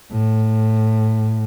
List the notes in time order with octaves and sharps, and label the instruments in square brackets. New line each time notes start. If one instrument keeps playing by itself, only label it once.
[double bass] A2